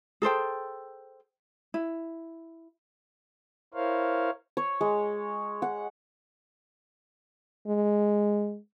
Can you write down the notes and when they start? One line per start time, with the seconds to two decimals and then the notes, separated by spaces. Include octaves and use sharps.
0.22 G#4 A4 C5 G5
1.74 E4
3.74 E4 A#4 C5 C#5 F5
4.57 C#5
4.81 G#3
5.62 F#5
7.67 G#3